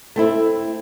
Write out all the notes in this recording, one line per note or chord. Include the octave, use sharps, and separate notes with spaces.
A3 C4 E4